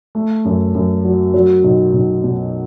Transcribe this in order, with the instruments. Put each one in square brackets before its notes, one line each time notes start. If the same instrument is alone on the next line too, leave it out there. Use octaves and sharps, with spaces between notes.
[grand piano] A3
F#2
F#2
F#3
F#3
B1
B1
B2